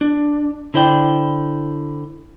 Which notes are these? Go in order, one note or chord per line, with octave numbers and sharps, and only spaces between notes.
D4
D3 E4 C5 D5 G5